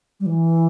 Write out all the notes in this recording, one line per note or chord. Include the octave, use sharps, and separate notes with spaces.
G3
E3